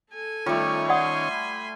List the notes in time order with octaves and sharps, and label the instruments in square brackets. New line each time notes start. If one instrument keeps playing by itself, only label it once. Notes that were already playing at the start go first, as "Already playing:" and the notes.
[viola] A4 G#5
[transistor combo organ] D#3 C#4 C#5 [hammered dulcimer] G3 A3 [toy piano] F4
[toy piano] D5 F#5 D#6 [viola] G#5 C6
[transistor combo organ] B5